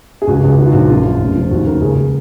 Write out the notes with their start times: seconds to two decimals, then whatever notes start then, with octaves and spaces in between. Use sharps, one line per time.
0.22 G#4
0.28 C#2 F#4
0.43 C#2 G#4
0.58 D#3 F#4
0.66 F4
0.72 A#1 F#4
0.89 F#2 F4
1.05 F#2
1.20 F1
1.36 F3
1.51 D#2 F#4
1.66 C#3 A#4
1.82 C#2 G#4